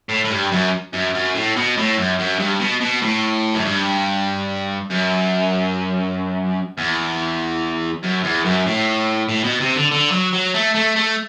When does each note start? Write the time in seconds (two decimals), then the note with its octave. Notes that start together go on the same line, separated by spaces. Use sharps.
0.09 A2
0.25 A2
0.30 G2
0.51 F#2
0.93 F#2
1.14 F#2
1.35 A2
1.56 B2
1.77 A2
1.97 F#2
2.19 F#2
2.39 G2
2.60 B2
2.81 B2
3.02 A2
3.54 F#2
3.65 G2
4.91 F#2
6.78 E2
8.03 F#2
8.24 E2
8.45 F#2
8.66 A2
9.29 A2
9.44 B2
9.60 C3
9.75 D3
9.91 D3
10.12 F#3
10.33 F#3
10.54 A3
10.75 A3
10.96 A3